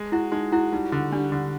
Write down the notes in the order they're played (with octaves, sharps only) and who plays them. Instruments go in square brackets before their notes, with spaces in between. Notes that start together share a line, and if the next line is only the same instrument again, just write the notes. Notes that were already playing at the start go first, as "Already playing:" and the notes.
Already playing: [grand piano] G#3
[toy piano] E4 [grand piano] F#4
[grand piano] G#3 [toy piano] D#4
[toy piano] E4 [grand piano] F#4
[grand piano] G3 [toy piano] D#4
[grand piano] D3
[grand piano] G3 [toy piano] D4
[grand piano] D3